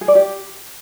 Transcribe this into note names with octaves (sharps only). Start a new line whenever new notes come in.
G#4
D5
G4